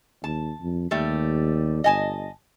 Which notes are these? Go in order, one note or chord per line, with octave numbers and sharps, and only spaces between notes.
D#2 A5
F2
D#2 G3 A3
G1 D#5 G#5 A5